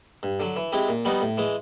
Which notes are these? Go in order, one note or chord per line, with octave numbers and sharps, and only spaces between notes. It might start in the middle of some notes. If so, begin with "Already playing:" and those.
G2
D3 F#3
E3
G#3 C4 E4 G4
A#2
G3 B3 D#4 F#4
A2
E3 G#3